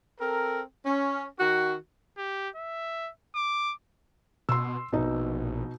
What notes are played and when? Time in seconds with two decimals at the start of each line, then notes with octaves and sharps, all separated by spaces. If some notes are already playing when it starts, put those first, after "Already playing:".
0.20 C4 A4 A#4
0.85 C#4
1.39 D#3 D#4 F#4
2.18 G4
2.56 E5
3.36 D6
4.49 B2 C6 E6
4.93 A#1 B2 D#4